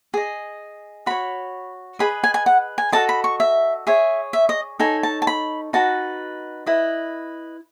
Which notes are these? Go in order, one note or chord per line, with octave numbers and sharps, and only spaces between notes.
G#4 D#5
F#4 C#5 B5
G#4 B4 D#5 B5
G#5
G#5
F#5
G#5
F#4 A4 D#5 A5
B5
C#6
E5
G#4 C#5 E5
E5
D#5
D#4 A4 C#5 G#5
A5
A5
B5
D#4 F#4 B4 A5
E4 B4 D#5